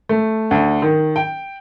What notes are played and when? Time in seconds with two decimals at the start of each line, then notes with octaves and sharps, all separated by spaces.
0.09 A3
0.51 D2
0.82 D#3
1.16 G5